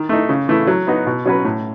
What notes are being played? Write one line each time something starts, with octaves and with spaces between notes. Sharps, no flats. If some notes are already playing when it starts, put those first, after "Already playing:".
Already playing: D#3
A3 D#4
C#3
E3 A3 E4
F#3
B3 D#4 F#4
B2
F#3 C#4 F#4 B4
A2